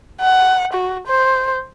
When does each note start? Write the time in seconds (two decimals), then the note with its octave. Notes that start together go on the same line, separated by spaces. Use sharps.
0.21 F#5
0.73 F#4
1.07 C5